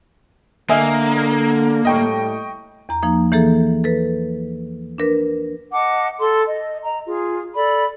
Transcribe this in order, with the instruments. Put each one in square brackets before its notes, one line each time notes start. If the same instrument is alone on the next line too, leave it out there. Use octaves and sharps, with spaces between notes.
[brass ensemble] D3 [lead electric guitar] A#3 [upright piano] D#5 E5 G#5
[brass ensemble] A2 G3 A3 [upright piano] D#5 G5 C#6
[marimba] E2 A#5
F3 A#3 D#4
E3 A#3 G#4 A4
A4 B4
D4 A#4 B4
[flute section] D#5 F#5 A5 D6
A4 C6
D#5
D#5 A#5
F4 G#4
A4 D5 B5